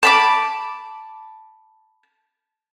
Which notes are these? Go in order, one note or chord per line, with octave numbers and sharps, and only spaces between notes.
A5 B5 D6